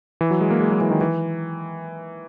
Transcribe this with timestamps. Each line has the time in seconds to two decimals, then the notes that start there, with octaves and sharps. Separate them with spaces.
0.21 E3
0.31 F#3
0.41 G#3
0.51 A#3
0.60 G#3
0.71 F#3
0.81 E3
0.91 D#3
1.01 E3